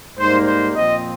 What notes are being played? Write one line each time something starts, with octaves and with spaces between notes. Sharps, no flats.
G#2 G3 A#3 D#4 C5
C5
A#2 F3 C4 D#5